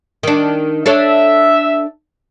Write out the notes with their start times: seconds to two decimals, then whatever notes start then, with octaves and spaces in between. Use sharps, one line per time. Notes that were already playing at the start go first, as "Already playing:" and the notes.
0.23 D#3 D4
0.86 D4 A4 C#5 E5